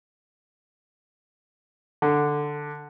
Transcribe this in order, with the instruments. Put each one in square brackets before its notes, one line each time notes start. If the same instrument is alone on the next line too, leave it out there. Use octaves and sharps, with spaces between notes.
[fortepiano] D3